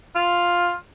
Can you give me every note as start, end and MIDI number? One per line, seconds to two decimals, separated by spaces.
0.15 0.73 65